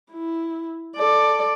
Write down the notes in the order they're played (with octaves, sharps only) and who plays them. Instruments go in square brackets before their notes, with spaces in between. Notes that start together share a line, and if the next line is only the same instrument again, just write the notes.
[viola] E4
A4 D5